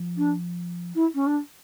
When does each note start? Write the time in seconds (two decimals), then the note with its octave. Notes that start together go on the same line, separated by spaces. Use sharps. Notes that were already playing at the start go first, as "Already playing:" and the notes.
Already playing: F3
0.17 D4
0.95 E4
1.14 C#4
1.26 D4